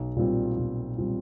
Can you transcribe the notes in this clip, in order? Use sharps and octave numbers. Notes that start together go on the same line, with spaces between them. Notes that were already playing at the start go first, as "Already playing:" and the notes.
Already playing: B1
A#2 G3 C4 F4
B1
A#2 G3 C4 F4